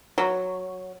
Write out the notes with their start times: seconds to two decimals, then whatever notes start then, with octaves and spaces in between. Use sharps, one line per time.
0.18 F#3